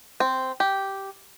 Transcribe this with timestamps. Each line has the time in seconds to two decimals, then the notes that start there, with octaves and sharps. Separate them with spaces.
0.20 C4
0.60 G4